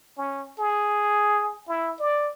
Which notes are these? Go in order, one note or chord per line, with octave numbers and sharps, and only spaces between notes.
C#4
G#4
E4
D5